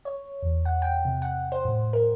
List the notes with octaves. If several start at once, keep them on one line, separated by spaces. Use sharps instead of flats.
C#5
E2
F#5
G5
C3
F#5
C5
A2
A#4